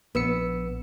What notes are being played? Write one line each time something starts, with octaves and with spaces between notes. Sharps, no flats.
A#1 B3 E6 C#7